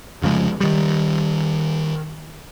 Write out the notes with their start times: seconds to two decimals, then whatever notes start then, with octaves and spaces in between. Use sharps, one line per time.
0.22 F1 C#3 F3 G#3
0.61 D#3 G3